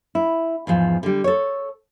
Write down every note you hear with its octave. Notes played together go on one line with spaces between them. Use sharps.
E4
E2 G#2 F3
D3 G3
A4 C#5